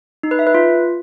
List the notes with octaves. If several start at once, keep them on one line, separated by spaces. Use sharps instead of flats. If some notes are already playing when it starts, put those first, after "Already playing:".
D#4
B4
E5
B4
F4